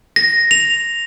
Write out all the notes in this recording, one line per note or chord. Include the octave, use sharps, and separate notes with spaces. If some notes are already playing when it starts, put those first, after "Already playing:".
A#6
F7